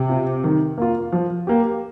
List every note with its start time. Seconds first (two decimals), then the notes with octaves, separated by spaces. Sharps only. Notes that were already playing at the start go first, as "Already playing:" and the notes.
Already playing: C3
0.09 C4 F4
0.44 D#3
0.78 A#3 F4
1.12 F3
1.47 A#3 G4